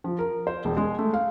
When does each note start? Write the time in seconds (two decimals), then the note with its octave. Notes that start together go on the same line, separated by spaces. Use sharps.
0.04 F3
0.19 A#4
0.47 C5
0.65 E1
0.77 G#3
0.99 A3
1.14 F5